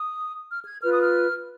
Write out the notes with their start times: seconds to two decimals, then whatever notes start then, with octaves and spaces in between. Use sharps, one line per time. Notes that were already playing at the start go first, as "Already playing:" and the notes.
Already playing: D#6
0.50 F6
0.66 G#6
0.82 F4 B4 F6
0.92 D#6
1.02 F6